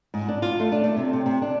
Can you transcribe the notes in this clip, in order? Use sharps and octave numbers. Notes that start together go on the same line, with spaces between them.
G#2
D4
F4
A3
D4
A3
C3
C3
C3
D4